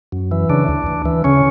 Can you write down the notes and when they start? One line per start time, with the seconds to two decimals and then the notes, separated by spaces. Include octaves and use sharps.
0.12 F#2
0.31 E3
0.50 C#3 D4
0.68 D2
0.87 D2
1.05 E3
1.24 C#3 C#4